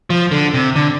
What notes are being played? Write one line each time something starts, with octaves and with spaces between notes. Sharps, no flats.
F3
D3
C3
D3